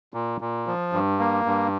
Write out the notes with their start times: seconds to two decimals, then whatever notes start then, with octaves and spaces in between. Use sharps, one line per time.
0.14 A#2
0.41 A#2
0.67 F3
0.93 G2
1.19 A#3
1.46 G2